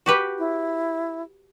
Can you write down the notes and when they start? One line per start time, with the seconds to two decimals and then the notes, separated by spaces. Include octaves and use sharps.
0.06 F#4 G4 B4
0.38 E4